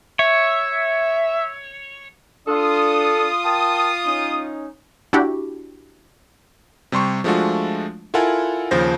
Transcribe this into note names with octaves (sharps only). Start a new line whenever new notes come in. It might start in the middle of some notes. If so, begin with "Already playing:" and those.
C#5 E5
D4 F4 A4 D#6
A#4 G5 A5
C#4 D#4
D4 E4 F#4 G4
C3 G3 C6 C#6
F3 G#3 A3 D4 F4 F#4
E4 F4 A4 A#4 F#5 G#5
D#2 C#3 F3 C5 A#6